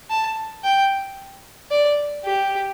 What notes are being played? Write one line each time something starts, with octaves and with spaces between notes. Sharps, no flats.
A5
G5
D5
G4